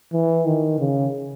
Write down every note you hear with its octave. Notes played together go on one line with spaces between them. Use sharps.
E3
D#3
C#3